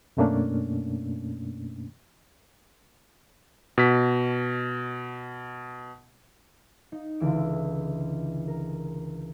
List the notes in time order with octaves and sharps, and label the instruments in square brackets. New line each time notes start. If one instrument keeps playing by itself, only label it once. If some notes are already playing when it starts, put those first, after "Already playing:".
[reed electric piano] F#2 B2 A3 A#3 C#4 D4
[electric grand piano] B2 B6
[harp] D#4
C#2 D3 E3 E6 D7
A#4